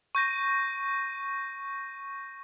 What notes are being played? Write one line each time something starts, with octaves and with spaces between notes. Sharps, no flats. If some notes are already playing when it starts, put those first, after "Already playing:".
C#6 G6 A#6 D#7